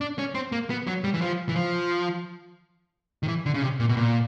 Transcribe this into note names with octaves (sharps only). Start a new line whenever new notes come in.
D4
C#4
C4
A#3
B3
F#3
G3
E3
F3
E3
F3
D#3
E3
D3
C#3
C3
A#2
B2
A#2